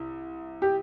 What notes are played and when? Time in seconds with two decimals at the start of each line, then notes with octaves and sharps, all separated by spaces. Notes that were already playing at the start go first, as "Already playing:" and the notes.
Already playing: C2 E4
0.62 G4